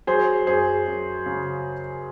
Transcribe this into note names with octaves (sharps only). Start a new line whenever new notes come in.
F#3 G#4 C5
F#2 G#4 C5
F#2
C#3